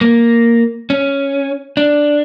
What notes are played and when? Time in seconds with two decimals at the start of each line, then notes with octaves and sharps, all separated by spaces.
0.01 A#3
0.90 C#4
1.77 D4